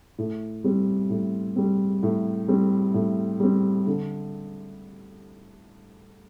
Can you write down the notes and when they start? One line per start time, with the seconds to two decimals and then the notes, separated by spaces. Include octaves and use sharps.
0.18 A2
0.64 G3 C4
1.10 A2
1.56 G3 C4
2.03 A2
2.48 G3 C4
2.94 A2
3.40 G3 C4
3.87 D3